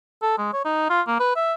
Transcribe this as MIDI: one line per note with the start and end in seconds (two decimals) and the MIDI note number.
0.22 0.38 69
0.38 0.49 56
0.53 0.62 73
0.65 0.85 63
0.90 1.01 65
1.07 1.16 58
1.20 1.32 71
1.36 1.54 76